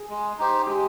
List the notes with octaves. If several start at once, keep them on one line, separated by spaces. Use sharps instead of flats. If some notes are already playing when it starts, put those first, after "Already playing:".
Already playing: G#4
G#3
D#4 G4 C5
G#3 G4